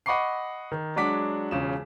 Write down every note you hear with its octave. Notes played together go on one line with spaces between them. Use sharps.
D#5 F#5 B5 C#6 D6 C7
D#3
F#3 G#3 D4 F#5 D6 B6
E1 C#3 F4 E7